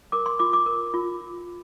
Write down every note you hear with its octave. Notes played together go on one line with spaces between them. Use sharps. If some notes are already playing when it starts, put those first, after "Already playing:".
A#4 D6
C6
F4 D6
D6
A#4
F4